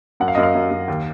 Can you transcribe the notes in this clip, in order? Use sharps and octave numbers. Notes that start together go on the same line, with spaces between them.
F#2 F#5
F5
D#5
F#2
F5
F#2
F#2
D#2